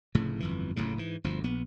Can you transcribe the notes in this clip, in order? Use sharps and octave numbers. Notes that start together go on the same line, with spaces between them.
F1 A2 C#3
G1 F2 E3
F#1 F2 A2 C#3
G#2 E3
G1 D2 F3
A#1 B3